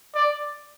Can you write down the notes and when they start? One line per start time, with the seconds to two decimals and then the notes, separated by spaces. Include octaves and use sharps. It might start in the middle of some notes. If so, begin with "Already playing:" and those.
0.15 D5